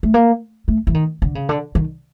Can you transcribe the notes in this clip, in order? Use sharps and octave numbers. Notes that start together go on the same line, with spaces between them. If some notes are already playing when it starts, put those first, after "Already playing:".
A3
A#3
A3
E3
D#3
D3
C#3
D3
D#3